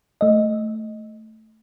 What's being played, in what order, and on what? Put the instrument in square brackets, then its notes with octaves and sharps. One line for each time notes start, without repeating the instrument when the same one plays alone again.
[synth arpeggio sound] A3 D#5